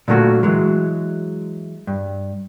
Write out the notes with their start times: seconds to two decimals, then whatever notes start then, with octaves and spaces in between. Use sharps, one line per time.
0.08 A#2 D3 F#3 A3 A#3 F#4
0.43 E3 F#3 G#3
1.87 G2